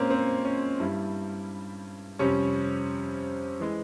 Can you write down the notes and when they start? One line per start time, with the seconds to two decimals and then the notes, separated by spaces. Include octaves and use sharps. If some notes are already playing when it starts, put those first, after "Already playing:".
Already playing: A#2 G#3 A#3 C4 C#4
0.10 C4
0.45 C#4
0.80 G2 G3 E4
2.19 F2 C3 G3 C#4
3.60 E3 G#3